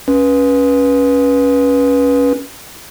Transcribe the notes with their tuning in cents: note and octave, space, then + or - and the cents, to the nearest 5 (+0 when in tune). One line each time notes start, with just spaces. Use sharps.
C#4 +0 B4 -20